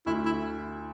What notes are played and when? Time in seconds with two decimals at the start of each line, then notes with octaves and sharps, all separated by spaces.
0.06 D2 E4
0.26 E4